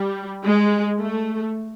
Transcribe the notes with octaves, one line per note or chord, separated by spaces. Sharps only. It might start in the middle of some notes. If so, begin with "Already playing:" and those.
Already playing: G3
G#3
A3